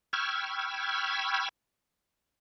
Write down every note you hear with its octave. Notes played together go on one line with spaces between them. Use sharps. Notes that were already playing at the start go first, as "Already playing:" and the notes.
G5 B5 C#6 E6 F6 G#6